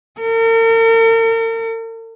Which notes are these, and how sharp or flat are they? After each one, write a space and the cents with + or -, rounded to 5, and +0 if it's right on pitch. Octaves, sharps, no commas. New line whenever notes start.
A#4 -45